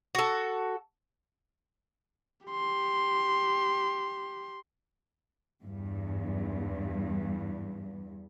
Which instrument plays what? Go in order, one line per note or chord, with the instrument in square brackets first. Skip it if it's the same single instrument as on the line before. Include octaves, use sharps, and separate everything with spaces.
[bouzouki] F#4 A4
[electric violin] G4 C6
[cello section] E2 G2